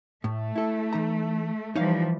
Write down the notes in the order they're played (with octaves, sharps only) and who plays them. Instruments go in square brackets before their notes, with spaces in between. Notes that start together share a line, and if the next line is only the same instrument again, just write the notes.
[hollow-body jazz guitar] A2 [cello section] A3
[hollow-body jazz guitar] E4 A4
E3 D#4 A#5
[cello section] E3 F3 G3 [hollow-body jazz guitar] D#4 C#5 F5